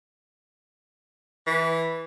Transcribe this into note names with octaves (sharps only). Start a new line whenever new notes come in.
E3